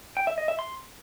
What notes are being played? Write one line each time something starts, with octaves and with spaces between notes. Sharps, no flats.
G5
E5
D#5
E5
C6